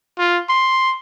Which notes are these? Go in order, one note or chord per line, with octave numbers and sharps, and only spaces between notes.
F4
C6